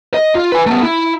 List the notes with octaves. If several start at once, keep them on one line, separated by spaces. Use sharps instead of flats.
D#5
F4
B4 G#5
A3 B3
E4